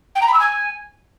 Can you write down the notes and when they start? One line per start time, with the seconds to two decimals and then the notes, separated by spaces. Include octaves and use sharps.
0.15 G5
0.21 A#5
0.27 B5
0.33 E6
0.39 G#5